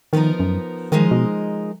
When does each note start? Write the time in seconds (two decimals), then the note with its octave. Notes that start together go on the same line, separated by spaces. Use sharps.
0.13 D#3 F3 B3 D#4 A#4
0.40 F#2
0.92 D#3 F3 G#3 D#4 A#4 D#5
1.11 B2